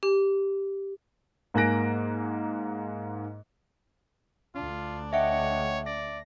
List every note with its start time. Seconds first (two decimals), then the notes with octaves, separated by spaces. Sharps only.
0.03 G4
1.54 G#2 A#3 G#5 F#6 A#6 D7
4.55 D2 D4 F4
5.13 C#5 D#5 E5 F#5 G5
5.86 D5 A#6